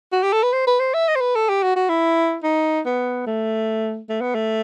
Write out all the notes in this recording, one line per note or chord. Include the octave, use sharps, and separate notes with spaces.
F#4
G4
A4
B4
C5
B4
C5
E5
D#5
C5
B4
A4
G4
F#4
F#4
E4
D#4
B3
A3
A3
B3
A3